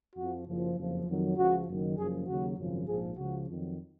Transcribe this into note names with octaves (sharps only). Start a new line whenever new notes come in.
F2 F3 F#4
F#1 F#2 F3
F#1 F2 F3
F2 D#3 F#3
C#2 C#3 F3 F#4
F#1 F#2 D#3 F#3
F#1 F#2 F3 G#4
D#2 C#3 F#3 F#4
G#1 F#2 C#3 F3
A#1 G#2 F3 G#4
C#2 C#3 F3 F#4
F2 D#3 F#3